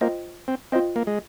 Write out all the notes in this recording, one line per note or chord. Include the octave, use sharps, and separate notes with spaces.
A#3 F4 C5 D#5 G5
C4
C4 F4 C5 D#5 G5
A#3
G#3